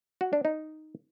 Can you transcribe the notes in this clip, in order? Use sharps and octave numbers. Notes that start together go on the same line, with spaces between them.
F#4
D4
D#4